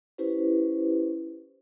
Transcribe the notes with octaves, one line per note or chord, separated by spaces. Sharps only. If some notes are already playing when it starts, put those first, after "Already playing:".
C#4 E4 G4 B4 C5